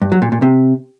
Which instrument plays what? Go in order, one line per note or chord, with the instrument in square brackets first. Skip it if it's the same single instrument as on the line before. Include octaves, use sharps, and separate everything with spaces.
[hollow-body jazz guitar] G2
F#3
A#2
A#2
C3